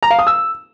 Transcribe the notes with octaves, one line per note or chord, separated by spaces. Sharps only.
A#5
F5
D#6
E6